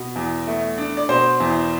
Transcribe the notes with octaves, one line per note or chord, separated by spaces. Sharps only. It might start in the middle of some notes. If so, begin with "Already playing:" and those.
Already playing: B2
E2
A3
D4
D5
B2 C5
E2